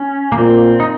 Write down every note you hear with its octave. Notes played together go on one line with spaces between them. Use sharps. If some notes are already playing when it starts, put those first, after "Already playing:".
Already playing: C#4
A#3
A#2 C4
D#4